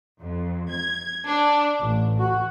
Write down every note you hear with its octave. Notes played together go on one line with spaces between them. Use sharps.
F2
G#6
D4
A1
F#4